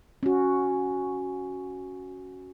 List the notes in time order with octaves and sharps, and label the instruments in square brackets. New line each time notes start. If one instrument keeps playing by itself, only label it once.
[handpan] C#4 F#4